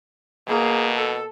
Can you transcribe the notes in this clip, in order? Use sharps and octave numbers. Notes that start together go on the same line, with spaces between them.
B2 A#3 G#4
A4